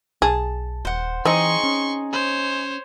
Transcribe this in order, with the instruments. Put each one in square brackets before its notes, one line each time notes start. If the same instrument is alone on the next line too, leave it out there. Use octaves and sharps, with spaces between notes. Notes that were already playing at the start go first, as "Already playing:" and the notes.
[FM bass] B1 [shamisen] G#4 [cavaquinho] A5
[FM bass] D#1 [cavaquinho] C5 F#5
[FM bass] E3 [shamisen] C4 [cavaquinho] D#4 G#4 [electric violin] C6 C#6
[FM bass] C#4
[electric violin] C5 C#5